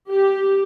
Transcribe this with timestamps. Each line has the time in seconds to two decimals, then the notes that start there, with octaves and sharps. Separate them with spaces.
0.10 G4